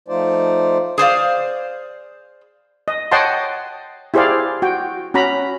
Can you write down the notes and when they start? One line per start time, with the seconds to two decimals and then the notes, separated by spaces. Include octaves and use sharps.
0.08 F3 A3 D#4 F4 C5 D5
0.98 G#4 C5 D5 F5
2.88 D#5
3.11 C#5 D#5 F#5 G5 A5 C6
4.14 E4 G4 G#4 C5 D5 F5
4.62 F#4 G5
5.14 C#4 F#4 A#5 B5